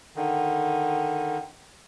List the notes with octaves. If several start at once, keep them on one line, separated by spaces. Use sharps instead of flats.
D3 D#3